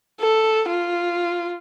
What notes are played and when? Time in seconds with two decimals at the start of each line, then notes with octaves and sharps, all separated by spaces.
0.20 A4
0.69 F4